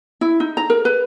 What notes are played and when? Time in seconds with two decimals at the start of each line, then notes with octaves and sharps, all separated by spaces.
0.21 E4
0.40 D#4
0.57 A#5
0.70 A#4
0.85 B4